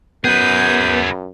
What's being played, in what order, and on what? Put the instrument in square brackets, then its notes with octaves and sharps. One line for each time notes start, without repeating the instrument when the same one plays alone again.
[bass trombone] F#2 [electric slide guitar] B3 [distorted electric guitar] G#4 B4 [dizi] G6